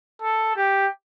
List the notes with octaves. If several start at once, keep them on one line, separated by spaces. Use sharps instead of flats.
A4
G4